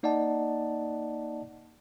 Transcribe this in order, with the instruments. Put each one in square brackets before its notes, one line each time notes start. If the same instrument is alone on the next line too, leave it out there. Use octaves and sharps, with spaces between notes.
[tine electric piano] A#3 D#4 D5 D#5 F#5 A5